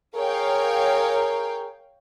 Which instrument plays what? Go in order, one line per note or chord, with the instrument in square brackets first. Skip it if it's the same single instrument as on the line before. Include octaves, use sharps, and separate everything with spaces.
[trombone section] G#4 A#4 [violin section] C#5 F5 G5